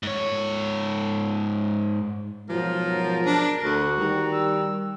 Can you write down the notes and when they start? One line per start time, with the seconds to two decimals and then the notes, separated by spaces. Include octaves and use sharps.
0.03 G#2 C#5
2.49 G#2 B2 F3 F#3 A#4
3.25 D4
3.63 D2 F#4
3.98 D#3 G3
4.33 E6